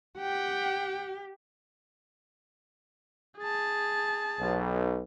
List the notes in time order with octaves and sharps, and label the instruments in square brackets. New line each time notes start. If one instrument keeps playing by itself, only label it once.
[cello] G4 [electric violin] F#5 G5
[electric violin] G#4 A5
[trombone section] B1